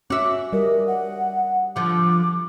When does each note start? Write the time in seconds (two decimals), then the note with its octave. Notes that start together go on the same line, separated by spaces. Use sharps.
0.10 C#4 F#4 E5 D6
0.53 G3 A#4 D#5
0.87 F#5
1.76 D3 F3 D6